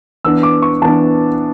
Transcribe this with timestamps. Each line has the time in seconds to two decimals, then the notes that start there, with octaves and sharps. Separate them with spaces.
0.24 E3 B3 D4 E6
0.43 D6
0.62 C#6
0.82 E3 B3 D4 A5